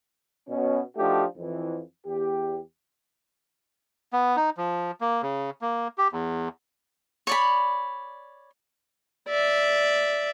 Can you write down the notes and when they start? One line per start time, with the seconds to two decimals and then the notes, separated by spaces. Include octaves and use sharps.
0.49 B2 C#4
0.97 F3 A3 D4 D#4 F#4 G4
1.37 F2 E3
2.06 E2 G4
4.13 B3
4.37 D#4
4.57 F3
5.01 A#3
5.22 C#3
5.61 A#3
5.98 G4
6.12 E2
7.27 C#5 D5 B5
9.28 D5 E5